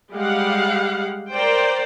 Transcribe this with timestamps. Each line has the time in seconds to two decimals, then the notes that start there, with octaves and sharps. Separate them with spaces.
0.13 G3 G#3 G4 F5 F#5
1.32 A#4 C5 D5 G5